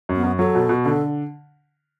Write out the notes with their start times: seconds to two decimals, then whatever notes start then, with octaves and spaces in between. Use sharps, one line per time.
0.09 F#2
0.16 B3
0.23 F#2
0.39 F#3 A4
0.55 B2
0.69 B2
0.85 D3 A4